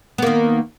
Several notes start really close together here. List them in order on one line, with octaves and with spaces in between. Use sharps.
B3 A#3 D#3